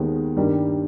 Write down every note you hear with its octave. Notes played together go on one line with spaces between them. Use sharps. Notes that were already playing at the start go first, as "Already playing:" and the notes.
Already playing: D#2 D#3 G#3 B3
G2 D#3 G3 A#3